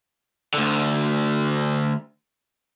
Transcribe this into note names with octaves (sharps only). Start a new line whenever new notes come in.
D2 D3